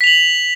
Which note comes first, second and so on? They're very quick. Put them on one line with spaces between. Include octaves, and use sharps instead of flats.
B6 F7 F#7